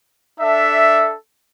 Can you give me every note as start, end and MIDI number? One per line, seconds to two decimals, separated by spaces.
0.40 1.12 62
0.40 1.12 69
0.40 1.12 76